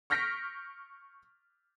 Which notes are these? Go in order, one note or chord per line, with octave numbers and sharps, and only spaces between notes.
C#6 F6 G6 A#6 B6 D7